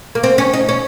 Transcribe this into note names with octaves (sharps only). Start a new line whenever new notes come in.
A#3
C4
C#4
D#4
C#4